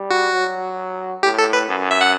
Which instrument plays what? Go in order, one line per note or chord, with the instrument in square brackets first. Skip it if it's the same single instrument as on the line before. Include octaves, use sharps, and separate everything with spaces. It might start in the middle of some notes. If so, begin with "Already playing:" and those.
Already playing: [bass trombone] G3
[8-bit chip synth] F#4
[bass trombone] F#3
[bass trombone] A2 [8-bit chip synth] G4
[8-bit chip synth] A4
B4
[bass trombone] F#2
[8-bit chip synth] E5
F#5